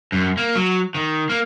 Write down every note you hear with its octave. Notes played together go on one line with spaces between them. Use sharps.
F#2
A#3
F#3
D#3
A#3